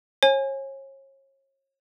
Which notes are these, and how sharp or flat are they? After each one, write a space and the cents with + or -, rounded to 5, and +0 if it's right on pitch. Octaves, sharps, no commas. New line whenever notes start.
C#5 -35 G#5 +0